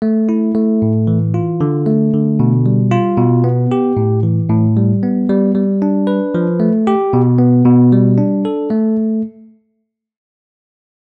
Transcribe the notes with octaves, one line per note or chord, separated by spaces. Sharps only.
A3
E4
A3
A2
E3
F4
D3
A3
D3
B2
G3
F4
B2
B3
G4
A2
E3
A2
G3
B3
G3
G3
D4
B4
F3
A3
G4
B2
B3
B2
G3
D4
A4
A3